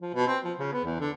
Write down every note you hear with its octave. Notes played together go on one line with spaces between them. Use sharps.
F3
B2
C4
F3
C#3
B3
E2
D3